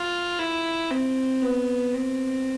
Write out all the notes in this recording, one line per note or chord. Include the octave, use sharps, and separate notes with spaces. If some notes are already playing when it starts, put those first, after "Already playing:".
Already playing: F4
E4
C4
B3
C4